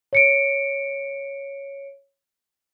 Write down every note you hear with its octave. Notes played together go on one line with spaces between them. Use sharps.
C#5 C#7 D7